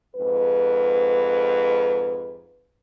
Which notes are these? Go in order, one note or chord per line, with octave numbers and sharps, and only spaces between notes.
F2 G#2 B4